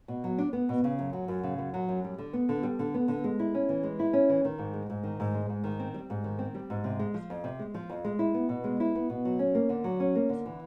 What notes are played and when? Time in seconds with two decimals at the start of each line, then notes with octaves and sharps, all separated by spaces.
0.08 B2
0.24 F#3
0.38 D4
0.53 B3
0.69 B2
0.84 C#3
0.99 F#2
1.13 F#3
1.28 F#2
1.43 C#3
1.58 F#2
1.74 F#3
1.89 F#2
2.04 G3
2.18 D3
2.33 B3
2.49 D3
2.63 G3
2.79 D3
2.94 B3
3.08 D3
3.24 G#3
3.39 E4
3.54 C#4
3.69 E3
3.83 G#3
3.99 E4
4.13 C#4
4.29 E3
4.45 D#3
4.58 G#2
4.74 G#3
4.90 G#2
5.03 D#3
5.20 G#2
5.34 G#3
5.49 G#2
5.64 D#3
5.79 C4
5.94 G3
6.10 G#2
6.24 D#3
6.39 C4
6.55 G3
6.70 G#2
6.84 C3
6.99 G#3
7.14 F3
7.30 F2
7.44 C3
7.59 G#3
7.74 F3
7.90 F2
8.05 G#3
8.19 E4
8.34 B3
8.49 B2
8.64 G#3
8.80 E4
8.95 B3
9.10 B2
9.25 F#3
9.39 C#4
9.55 A#3
9.69 D3
9.84 F#3
10.00 C#4
10.15 A#3
10.29 D3
10.46 E3